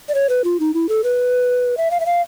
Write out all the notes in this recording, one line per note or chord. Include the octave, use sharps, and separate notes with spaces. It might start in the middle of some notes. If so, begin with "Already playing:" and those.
D5
C#5
B4
F4
D#4
E4
A4
B4
E5
F5
E5
F5